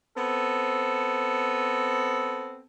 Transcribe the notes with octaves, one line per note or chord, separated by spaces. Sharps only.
B3 C4 A4